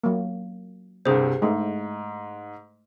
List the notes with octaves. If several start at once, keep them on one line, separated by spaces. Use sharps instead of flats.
F#3 A#3
C2 G2 C3 G#4 C5
G#2 G#3 A3